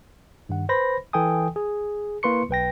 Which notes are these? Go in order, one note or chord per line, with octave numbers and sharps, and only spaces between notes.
G2 D#3 F#5
B4 C5 B5 A#6
E3 A4 G5 G#5 D#6
G#4
A#3 E4 B4 C6 C#6 C#7
B1 B4 G5 A#6